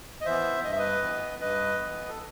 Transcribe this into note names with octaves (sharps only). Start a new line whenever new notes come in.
D#5
E3 B3 C5 E5
G2 D#5
E5
B4 D#5
E3 B3
G2 B4 D#5
E3 B3
A4